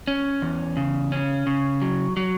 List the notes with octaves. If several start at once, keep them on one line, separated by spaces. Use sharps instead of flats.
C#4
E2
C#3
C#4
C#3
F#3
F#3